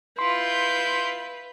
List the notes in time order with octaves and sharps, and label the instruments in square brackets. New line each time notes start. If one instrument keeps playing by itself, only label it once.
[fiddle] E4 F4 [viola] B4 [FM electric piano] C6 [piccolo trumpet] G6